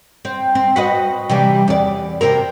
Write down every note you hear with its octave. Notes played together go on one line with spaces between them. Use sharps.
C4
C4
F#4 B4 D#5
C3 E3 G3
E2 D5
C3 C4 A#4